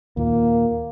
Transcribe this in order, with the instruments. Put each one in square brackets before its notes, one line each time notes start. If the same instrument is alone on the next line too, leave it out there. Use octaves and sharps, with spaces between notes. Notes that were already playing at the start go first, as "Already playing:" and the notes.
[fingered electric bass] D#2 A#2 [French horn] A#3